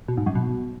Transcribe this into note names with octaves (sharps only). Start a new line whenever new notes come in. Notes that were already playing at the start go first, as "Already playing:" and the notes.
B2
G#2
F#2
B2